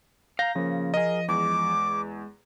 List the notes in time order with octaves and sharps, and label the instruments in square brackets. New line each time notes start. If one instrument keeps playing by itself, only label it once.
[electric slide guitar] F5 [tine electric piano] A#5 G6 [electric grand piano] A#6
[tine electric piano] C#3 A#3 [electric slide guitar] F3
[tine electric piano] G#4 A#4 [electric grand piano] D#5
[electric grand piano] E2 [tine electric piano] G#3 [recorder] D6